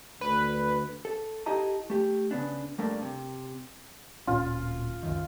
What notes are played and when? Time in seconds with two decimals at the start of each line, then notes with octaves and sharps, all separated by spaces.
0.21 D2 B4
1.05 A4
1.46 D#4 E4 G4 A4 D#5 A#5
1.90 A3 G4
2.31 C#3 B3 D4
2.78 G2 A3 A#3 D4
3.02 C3
4.27 D1 A#2 C#4 F4
5.03 C#2 F#2 D#3